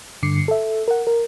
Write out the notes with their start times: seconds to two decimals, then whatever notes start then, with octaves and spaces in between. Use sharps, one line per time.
0.23 G2 D3 D6 C7 C#7
0.48 A4 E5
0.88 A#4 F#5
1.07 A#4